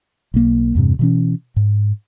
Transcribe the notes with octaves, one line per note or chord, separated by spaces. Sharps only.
B1 A#3
E2 G2 C3
B2 E3 C#4
G#2